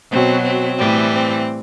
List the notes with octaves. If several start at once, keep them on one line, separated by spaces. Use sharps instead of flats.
B2 F#3 C4
C4
A2 E3 G3
C4